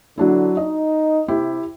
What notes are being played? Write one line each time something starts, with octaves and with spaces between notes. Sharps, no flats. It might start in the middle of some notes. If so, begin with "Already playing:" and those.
D3 F#3 D4 E4
D#4 D#5
C3 E4 G4